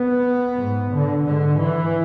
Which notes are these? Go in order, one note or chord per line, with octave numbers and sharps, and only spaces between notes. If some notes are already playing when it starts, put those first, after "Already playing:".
Already playing: B3
G#2
D3
G#2 D3
E3